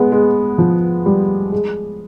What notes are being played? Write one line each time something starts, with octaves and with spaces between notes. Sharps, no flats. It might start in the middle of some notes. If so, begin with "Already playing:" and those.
Already playing: G#3 B3
G#3
F3
G3
G#3